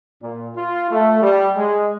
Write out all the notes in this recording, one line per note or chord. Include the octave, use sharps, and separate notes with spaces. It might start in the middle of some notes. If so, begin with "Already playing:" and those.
A#2
F4
A3
G3
G#3